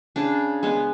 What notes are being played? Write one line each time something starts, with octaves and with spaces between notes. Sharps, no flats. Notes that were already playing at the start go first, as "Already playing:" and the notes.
C#3 D4
G#3 B3